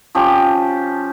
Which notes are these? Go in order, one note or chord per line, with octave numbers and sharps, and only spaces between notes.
F3 C#4 G4